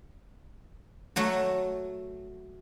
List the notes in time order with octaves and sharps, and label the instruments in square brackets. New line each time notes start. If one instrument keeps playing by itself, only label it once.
[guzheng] F#3 A3 F#4